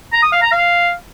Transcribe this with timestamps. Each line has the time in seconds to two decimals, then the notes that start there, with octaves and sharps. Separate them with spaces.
0.13 A#5
0.22 D#6
0.32 F5
0.42 A#5
0.52 F5